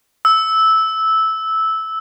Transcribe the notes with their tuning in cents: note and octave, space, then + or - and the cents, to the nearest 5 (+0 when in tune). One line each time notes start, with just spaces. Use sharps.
E6 -10